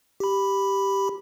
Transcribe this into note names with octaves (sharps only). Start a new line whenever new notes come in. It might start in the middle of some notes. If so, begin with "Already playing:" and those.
G4 B5